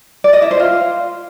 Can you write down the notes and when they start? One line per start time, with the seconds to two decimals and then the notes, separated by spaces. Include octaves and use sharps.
0.24 D5
0.33 D#5
0.42 E4
0.51 C5
0.60 F4